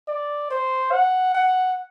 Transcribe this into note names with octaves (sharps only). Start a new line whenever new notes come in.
D5
C5
F#5
F#5